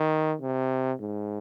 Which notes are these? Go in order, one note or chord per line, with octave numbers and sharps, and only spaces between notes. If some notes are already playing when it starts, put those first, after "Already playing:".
Already playing: D#3
C3
G#2